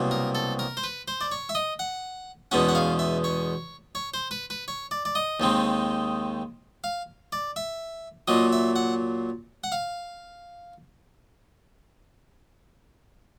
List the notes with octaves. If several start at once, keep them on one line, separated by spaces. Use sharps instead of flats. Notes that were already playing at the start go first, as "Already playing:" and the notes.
Already playing: C2 B2 F#3 A#3
A#4
A4
A#4
C5
B4
C5
D5
C#5
E5
D#5
F#5
E2 B2 G#3 C#4 F#5
F#5
F5
E5
C#5
C#5
C5
B4
B4
C#5
D5
D5
D#5
D#2 D#3 G#3 C4
F5
D5
E5
A#2 F#3 A#3 D#5
E5
F#5
F#5
F5